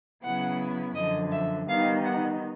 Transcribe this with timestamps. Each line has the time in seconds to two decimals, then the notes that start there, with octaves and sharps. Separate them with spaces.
0.23 C#3 F#3 B3 E4 F#5
0.95 F#2 D3 F3 D#5
1.32 E5
1.67 D#3 G3 B3 D#4 F5
2.04 F#5